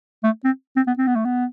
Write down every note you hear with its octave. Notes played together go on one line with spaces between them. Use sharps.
A3
C4
C4
B3
C4
B3
A3
B3